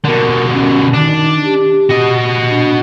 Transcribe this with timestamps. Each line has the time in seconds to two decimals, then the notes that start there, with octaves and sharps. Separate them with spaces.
0.05 B2 D3 A#4
0.53 C#4
0.94 D#3 D4
1.44 G4
1.90 F#4 D#5
2.49 D4